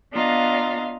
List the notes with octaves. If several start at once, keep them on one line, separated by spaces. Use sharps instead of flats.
B3 D4 F4 D#5 F5 A#5